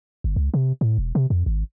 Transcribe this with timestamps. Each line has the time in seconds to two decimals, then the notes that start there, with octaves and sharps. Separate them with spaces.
0.24 G1
0.36 C#2
0.54 C3
0.81 A2
0.98 E1
1.15 C3
1.30 F2
1.46 G#1